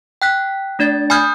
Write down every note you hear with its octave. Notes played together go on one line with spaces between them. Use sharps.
G5 F#6 B6
A3 D4 D5 A6
G#5 B5 D#6 F6 G6 G#6